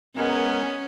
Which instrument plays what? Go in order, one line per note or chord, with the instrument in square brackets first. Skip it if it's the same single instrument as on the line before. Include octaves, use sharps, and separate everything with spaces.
[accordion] G#3 A#4 G#5 [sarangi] B3 [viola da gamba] C#4